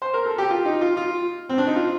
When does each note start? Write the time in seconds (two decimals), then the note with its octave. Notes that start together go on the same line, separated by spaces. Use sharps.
0.02 C5
0.14 A#4
0.26 A4
0.38 G4
0.50 F4
0.65 D#4
0.81 F4
0.97 F4
1.49 C4
1.58 D4
1.67 D#4
1.76 F4